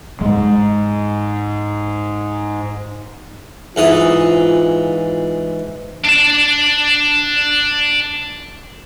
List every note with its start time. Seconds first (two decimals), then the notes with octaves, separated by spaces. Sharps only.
0.21 G#2 G#3
3.76 G#2 E3 F4 D#6
6.05 D4 A5